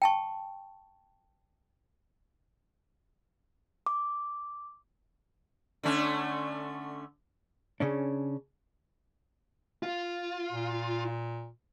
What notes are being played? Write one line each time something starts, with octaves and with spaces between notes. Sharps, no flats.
G5 A5 C#6
D6
D3 A3 C#4
C#3 C#4 D4
F4
A#2